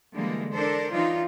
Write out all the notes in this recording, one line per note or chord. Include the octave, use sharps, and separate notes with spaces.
D3 E3 G3 G#3 A#3
D4 A4 A#4 C5
E3 D4 D#4 F4